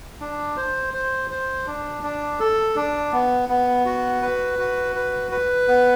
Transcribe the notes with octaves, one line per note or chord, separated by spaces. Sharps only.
D4
C5
C5
C5
D4
D4
A4
D4
B3
B3
F#4
B4
F#4
B4
B4
B3